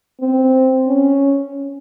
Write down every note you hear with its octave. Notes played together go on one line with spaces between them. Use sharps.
C4
C#4